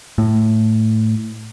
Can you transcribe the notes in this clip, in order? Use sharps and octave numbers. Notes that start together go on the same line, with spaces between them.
A2